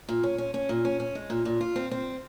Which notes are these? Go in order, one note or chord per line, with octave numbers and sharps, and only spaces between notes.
A#2
C#4
C#4
C#4
A#2
C#4
C#4
G#3
A#2
A#2
F4
C4
C4